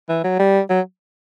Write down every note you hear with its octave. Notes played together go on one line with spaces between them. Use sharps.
E3
F#3
G3
F#3